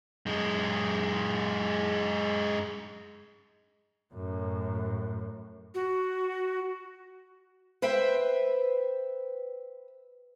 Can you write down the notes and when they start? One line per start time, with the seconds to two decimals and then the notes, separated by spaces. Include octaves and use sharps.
0.26 F#2 G#3
4.14 F#2 A2
5.75 F#4
7.82 B4 C5 E5 G5